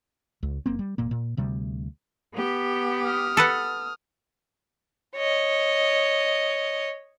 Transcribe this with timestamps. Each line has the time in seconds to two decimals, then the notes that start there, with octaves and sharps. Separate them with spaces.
0.43 C#2
0.66 F#1 A#3 C4
0.79 G3
0.98 E1 A#2 A#3
1.11 A#2
1.37 D2 C3 G3
2.35 B3 G4
3.05 D#6 F6
3.37 A4 B4 F#5
5.16 C#5 D#5